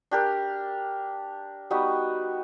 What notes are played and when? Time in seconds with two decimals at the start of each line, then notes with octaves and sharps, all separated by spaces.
0.11 D4 G4 A#4
1.70 G3 B3 D#4 F#4